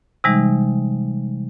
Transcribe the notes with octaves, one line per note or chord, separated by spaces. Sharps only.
C3 E3 G3 G#3 D#4